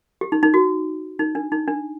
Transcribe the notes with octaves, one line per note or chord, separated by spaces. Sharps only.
G4
D#4
D#4
F#4
D#4
D4
D#4
D4